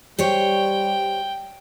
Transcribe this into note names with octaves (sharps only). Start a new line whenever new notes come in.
G3 G4 C5 C#5 G5